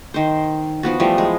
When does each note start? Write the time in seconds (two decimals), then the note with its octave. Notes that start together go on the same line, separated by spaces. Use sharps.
0.14 D#3 C5
0.83 F3 B3 F#4
1.00 E3 F3 G3 A3
1.18 G#3